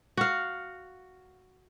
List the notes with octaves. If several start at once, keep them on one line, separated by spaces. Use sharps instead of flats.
F#4 F5